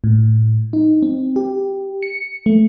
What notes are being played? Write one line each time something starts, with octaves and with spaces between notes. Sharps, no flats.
A2
D#4
C4
G4
C#7
A3